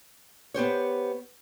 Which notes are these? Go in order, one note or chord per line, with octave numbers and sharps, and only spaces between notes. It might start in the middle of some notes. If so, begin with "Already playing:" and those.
B3 G4 C5 C#5